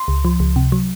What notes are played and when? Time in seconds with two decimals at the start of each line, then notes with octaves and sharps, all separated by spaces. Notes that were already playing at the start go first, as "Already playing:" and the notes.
Already playing: C6
0.08 C#2
0.25 F3
0.40 C#2
0.56 C3
0.72 F#3